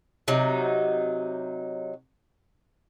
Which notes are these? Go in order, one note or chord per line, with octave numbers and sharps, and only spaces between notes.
C3 F#3 D#4